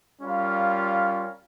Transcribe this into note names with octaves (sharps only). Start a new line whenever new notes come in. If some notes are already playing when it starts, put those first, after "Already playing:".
G3 C#4 F4 A#4 F5